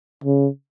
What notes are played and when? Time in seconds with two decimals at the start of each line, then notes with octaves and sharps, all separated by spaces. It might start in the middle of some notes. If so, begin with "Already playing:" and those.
0.24 C#3